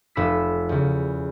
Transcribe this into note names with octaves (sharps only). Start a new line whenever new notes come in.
F1 B5 E6 B6
E2 C#3